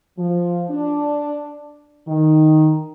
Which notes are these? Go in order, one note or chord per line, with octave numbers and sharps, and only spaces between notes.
F3
D4
D#3